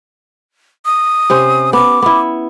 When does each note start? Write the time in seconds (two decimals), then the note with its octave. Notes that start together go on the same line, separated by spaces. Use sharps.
0.85 D#6
1.30 C3 C#4 C5
1.73 B3 D6
2.02 B3 E4